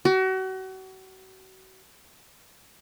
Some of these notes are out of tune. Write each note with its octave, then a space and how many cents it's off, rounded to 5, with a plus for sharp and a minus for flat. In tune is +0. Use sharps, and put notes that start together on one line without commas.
F#4 +35